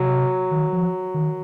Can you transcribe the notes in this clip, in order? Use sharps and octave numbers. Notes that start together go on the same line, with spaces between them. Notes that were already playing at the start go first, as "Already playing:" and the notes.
Already playing: C3 F#3
D#3
F3
D#3